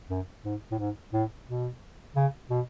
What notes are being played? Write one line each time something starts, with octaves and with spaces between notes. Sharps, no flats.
F#2
G#2
A2
G#2
A2
B2
C#3
B2